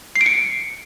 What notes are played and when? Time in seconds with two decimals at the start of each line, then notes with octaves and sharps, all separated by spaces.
0.16 C7
0.21 D7
0.26 C#7